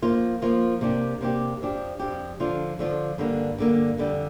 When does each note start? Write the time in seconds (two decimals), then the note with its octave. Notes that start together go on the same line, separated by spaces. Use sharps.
0.02 F3 A#3 F4
0.42 F3 A#3 F4
0.81 C3 A#3 D4 G4
1.21 C3 A#3 D4 G4
1.61 F2 F3 D4 G4
2.00 F2 F3 D4 G4
2.40 D3 F3 D4 F4
2.79 D3 F3 D4 F4
3.18 G2 D3 A#3
3.58 G2 D3 A#3
3.98 F2 D3 G3